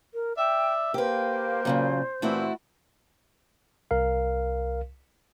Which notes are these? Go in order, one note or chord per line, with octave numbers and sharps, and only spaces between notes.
A#4
D5 E5 G5
A#3 G4 B4 C5
A#2 C#3 F#3
A#2 E3 A3 C4 E4 F#4
C2 A#4 F5